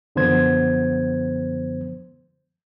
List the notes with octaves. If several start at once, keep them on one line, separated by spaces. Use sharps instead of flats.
F#2 D3 F3 B3 C5 G#6